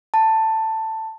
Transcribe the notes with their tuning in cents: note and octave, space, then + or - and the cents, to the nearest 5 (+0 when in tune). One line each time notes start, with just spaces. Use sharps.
A5 +10